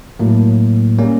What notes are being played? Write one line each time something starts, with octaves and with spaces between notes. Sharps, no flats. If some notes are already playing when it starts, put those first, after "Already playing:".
A2 F#3 A#3
G3 A#3 C#4